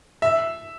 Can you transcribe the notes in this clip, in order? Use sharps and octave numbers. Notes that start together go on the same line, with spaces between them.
E5